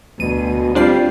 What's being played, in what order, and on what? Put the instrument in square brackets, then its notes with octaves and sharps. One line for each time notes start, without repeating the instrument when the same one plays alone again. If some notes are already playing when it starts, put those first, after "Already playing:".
[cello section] D2 [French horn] B2 [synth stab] D#7
[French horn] G3 [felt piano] C4 F4 C5 [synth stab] D4 D5 C7